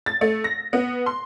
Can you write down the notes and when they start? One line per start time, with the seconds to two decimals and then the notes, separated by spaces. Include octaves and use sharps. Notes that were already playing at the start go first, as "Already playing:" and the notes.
0.06 A6
0.21 A3
0.44 A#6
0.73 B3
1.06 C6